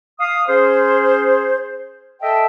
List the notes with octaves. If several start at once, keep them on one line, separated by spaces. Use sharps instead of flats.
F5 D#6
C#4 G#4 C5
A4 D#5 E5 G5 A5